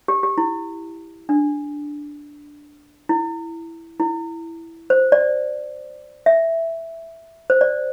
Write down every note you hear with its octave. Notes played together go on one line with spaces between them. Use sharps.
G4
G4
E4
D4
E4
E4
C5
D5
E5
C5
D5